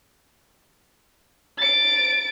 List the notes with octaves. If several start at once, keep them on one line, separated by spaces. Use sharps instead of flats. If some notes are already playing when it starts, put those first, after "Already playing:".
A6 D7